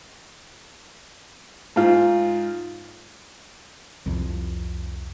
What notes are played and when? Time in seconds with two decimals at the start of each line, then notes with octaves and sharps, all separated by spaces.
1.76 G#2 F4
4.06 C2 F2